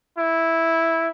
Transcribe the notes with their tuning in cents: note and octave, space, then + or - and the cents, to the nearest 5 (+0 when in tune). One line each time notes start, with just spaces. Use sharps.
E4 -5